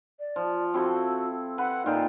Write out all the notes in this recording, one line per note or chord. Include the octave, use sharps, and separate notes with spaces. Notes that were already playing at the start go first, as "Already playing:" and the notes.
D5
F3
C4 E4 F#4 A4
B4 F#5
A#2 D#4 F4 G5